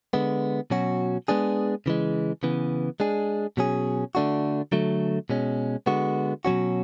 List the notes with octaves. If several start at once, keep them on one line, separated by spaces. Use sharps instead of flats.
D3 G#3 B3
B2 F#3 C#4 F#4
G#3 B3 D4 G#4
C#3 E3 G#3
C#3 E3 B3
G#3 D4 G#4
B2 F#3 C#4 G#4
D3 A3 D4 F#4
D3 F#3 A3
B2 G#3 C#4
D3 G#3 B3 F#4
B2 F#3 C#4 F#4